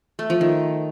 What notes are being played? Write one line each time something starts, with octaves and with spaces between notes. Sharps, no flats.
A3
F3
D#3